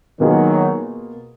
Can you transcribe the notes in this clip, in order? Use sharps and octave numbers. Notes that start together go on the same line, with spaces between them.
B2 D#3 F#3 A#3 F4 G#4